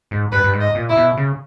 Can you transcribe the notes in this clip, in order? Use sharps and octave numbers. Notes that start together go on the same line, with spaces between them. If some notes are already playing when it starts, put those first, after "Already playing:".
G#2
G2 B4
G2
G#2
D#5
A#2
E4
B2
C#3